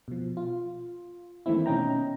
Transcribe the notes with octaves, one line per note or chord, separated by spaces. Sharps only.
B2 F3
F4
D#3 E3 A3 A#3 C4 E4
B2 C#4 D#4 G5 A#5